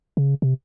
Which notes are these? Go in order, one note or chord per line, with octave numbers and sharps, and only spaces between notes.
C#3
C3